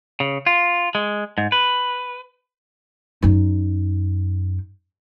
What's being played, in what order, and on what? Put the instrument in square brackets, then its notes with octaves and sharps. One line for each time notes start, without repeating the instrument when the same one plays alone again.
[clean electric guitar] C#3
F4
G#3
G#2
B4
[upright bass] F#2 D#4